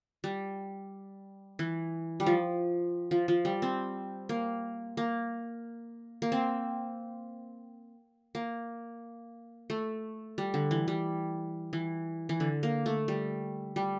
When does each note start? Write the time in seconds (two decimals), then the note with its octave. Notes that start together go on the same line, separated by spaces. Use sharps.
0.24 G3
1.59 E3
2.20 G3
2.26 F3
3.11 F3
3.28 F3
3.45 G3
3.62 C4
4.29 A#3
4.97 A#3
6.22 A#3
6.32 C4
8.35 A#3
9.70 A3
10.38 G3
10.54 D3
10.71 E3
10.88 G3
11.73 E3
12.29 E3
12.40 D3
12.63 A#3
12.86 A3
13.08 G3
13.76 G3